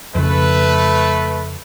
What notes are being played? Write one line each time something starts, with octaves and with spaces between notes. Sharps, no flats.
F2 C#3 A3 B4